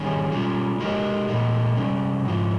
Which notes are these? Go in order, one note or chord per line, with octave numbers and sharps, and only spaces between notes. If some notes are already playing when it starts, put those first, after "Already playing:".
Already playing: D#3 G3 C#4 G#4
G3 C#4 F4
G#3 D#4 G4 A#4 D#5
A#2 G#3 D#4 A#4
C3 G3 C#4
G#2 F3 C4 F4